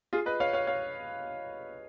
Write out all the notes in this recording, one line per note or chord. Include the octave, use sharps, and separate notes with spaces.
F4 G#4
B4 D#5
C#5 F5
C#5 F5
C#5 F5